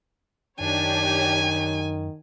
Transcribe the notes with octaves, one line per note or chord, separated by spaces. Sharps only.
F#2 D#3 D4 G4 C#5 G#5